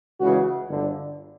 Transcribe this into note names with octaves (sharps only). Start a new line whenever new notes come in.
C#2 C#3 E3 F#4
G1 D3